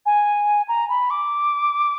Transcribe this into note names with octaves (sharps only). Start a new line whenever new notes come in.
G#5
A#5
B5
D6